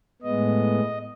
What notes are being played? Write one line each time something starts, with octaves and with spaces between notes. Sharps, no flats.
A2 G#3 B3 D#5